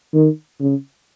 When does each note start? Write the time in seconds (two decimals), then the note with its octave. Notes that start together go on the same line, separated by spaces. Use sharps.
0.14 D#3
0.60 C#3